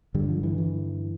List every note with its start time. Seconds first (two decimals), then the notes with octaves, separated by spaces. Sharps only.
0.14 G2 D3 G3
0.29 F3
0.43 E3
0.58 E3